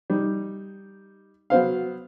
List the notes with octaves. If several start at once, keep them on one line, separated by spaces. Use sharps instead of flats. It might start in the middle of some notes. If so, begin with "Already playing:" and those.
G3 D#4
F#3 B3 C5 F5